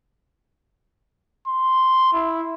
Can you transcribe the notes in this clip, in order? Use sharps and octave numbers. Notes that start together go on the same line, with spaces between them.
C6
E4